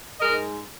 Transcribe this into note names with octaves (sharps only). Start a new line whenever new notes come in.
G#2 G#3 A#4 D#5